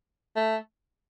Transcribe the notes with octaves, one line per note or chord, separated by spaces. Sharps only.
A3